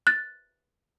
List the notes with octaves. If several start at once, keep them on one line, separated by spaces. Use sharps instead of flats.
F#6 A6